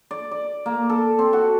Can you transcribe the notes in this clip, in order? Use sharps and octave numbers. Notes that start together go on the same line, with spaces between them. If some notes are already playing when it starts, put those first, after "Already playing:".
D5
D5
A#3
A4
C4
F#4